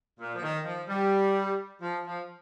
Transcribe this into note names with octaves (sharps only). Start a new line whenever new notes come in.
A#2
F3
D#3
F3
G3
F3
F3